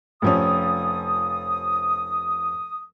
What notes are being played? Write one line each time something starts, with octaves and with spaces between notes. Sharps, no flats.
F1 F3 C#4 D#6